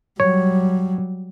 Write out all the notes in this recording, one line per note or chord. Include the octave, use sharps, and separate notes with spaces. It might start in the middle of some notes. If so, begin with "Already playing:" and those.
F#3 G3 C#5